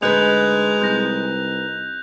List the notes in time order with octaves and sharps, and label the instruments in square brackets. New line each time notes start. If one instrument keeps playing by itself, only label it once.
[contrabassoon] D2 [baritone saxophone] G#3 [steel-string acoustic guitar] D#4 B4 [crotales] F#6 G6 F7
[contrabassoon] C2 [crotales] G6 A#6